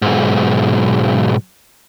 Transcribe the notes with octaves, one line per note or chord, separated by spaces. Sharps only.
B1 G#2